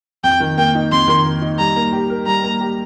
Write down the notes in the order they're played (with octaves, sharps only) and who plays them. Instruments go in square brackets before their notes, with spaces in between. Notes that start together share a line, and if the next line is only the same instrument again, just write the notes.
[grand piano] F2 [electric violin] G5
[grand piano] D#3
[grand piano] A#3 [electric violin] G5
[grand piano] D#4
[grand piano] F2 [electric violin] C6
[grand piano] D#3
A#3
D#4
[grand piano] G3 [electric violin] A#5
[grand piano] A#3
G4
A#4
[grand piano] G3 [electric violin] A#5
[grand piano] A#3
G4